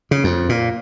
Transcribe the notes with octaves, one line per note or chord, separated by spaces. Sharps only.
C#3
F2
A#2